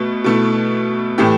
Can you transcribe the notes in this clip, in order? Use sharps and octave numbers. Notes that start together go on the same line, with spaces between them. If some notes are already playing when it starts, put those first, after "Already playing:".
Already playing: B2 A3
B2 A3 E4
A2 E3 A3 G4